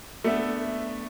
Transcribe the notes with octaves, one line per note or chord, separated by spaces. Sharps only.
A3 B3 D4 E5